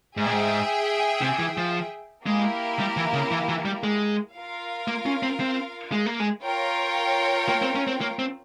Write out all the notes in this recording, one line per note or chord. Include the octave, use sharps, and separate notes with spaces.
G#2 G#4 E5 G5
A#2
G#2
C3
E3
F3
G#3 A#3 E4 G4 A#4
G3
E3
C#3
E3
E3
G3
G#3
F4 A#4 F5
A#3
C#4
C4
C4
G#3
A#3
G#3
F4 A#4 C#5 G5
A#3
C4
C#4
C4
A#3
C4